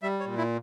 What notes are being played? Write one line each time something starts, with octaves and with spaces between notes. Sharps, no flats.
G3 E5
C#5
A#2
E4